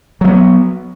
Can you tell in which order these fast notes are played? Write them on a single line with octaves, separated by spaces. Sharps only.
F#3 A3 B3